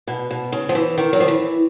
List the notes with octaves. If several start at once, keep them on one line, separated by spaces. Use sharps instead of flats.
B2
B2
C#3
F3
E3
D#3
F#3
F3
E3